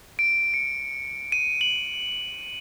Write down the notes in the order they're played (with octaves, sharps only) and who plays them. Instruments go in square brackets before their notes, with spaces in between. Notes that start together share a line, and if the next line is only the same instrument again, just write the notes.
[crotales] D7
C#7
D#7
F#7